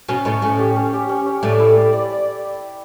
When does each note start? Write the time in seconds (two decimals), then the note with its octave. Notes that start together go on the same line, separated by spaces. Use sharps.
0.08 B2 B3 C#4
0.25 A2 A3 C#5
0.42 A2 A3 C#4
0.59 G4
0.76 C#4
0.93 G4
1.09 C#4
1.26 C#4
1.43 A2 A3 D5
1.59 E4
1.77 D5
1.93 D5
2.10 D5